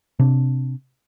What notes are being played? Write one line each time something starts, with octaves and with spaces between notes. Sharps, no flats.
C3 D4